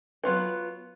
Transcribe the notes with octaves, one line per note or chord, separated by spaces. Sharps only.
F#3 B3 F4 B4